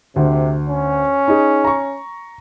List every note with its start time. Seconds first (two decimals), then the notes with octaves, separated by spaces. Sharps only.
0.16 D2 C3
0.69 C#4
1.28 D#4 G#4
1.64 A#5 C#6